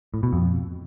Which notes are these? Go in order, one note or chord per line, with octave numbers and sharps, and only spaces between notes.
A2
B2
F2